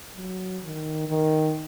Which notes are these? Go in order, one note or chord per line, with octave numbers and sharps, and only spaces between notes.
F#3
D#3
D#3